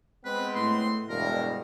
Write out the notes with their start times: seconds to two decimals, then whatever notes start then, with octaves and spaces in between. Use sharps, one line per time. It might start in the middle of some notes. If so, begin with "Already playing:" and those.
0.25 G#3 B3 C4 B4
0.55 A2 C6
1.09 E1 G2 B2 A#4